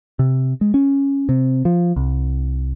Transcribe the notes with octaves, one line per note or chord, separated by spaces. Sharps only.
C3
G#3
C#4
C3
F3
C2